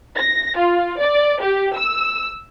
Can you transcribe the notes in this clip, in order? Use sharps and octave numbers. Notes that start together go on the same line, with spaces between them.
A#6
F4
D5
G4
E6